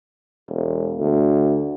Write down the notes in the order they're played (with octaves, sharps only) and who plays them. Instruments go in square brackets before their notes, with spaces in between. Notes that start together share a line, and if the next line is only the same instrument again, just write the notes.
[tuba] E1
D2